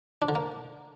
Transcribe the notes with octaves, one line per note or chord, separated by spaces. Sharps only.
D4
D3
A#3